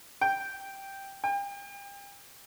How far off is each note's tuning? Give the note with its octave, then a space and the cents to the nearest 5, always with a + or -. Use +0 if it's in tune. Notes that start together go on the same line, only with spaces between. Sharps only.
G5 +0
G5 +40